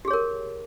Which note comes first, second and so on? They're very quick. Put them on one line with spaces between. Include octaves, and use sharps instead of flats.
G4 G#4 C#5 A#4